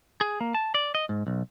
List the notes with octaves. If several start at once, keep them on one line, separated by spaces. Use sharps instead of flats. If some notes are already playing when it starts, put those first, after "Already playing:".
G#4
A#3
A5
D5
D#5
G#2
B1